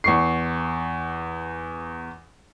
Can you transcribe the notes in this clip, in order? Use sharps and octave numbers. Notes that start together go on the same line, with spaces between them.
E2 C#6 C7